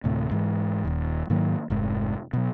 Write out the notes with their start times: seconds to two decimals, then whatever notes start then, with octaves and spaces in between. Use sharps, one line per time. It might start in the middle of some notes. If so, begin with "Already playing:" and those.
0.04 D2 A2 C3
0.31 G#2 E3
0.84 D#1 D#2
1.30 G#2 D#3 F#3 A#3
1.70 F1 G#2
2.33 B2 F#3